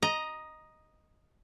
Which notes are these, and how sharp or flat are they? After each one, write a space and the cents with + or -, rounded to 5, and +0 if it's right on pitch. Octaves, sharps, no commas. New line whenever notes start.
D#5 +0 A#5 +15